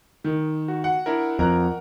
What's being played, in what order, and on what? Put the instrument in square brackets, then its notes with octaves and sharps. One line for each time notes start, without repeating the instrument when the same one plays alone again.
[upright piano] D#3
[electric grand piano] F#4
[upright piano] F#5
[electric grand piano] D4 E4 A#4
[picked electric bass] F2 [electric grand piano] A#4 A#5 F#6